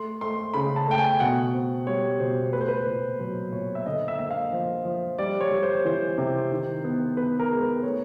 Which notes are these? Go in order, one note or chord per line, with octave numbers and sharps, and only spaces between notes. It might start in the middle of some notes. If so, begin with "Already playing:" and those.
Already playing: A3 C6
A3 C6
C#3 B5
A5
A3 G5
G#5
B2 F#5
C4
G3 C#5
B2 C5
A3 B4
C5
B4
A#2
F#3 C5
A#2 C#5
E5
D3 D#5
E5
A#3 E5
F5
F3
F3
G3 D5
C#5
G3
C5
C#5
E3 C5
C3
D#3
B3
B3 B4
A#4
G#3
B4
A3 C#5